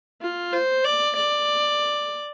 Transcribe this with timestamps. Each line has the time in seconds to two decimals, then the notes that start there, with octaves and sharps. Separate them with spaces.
0.22 F4
0.53 C5
0.84 D5
1.17 D5